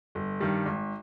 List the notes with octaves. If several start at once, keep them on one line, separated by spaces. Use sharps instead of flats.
G1
G2 D#3 G3
G#1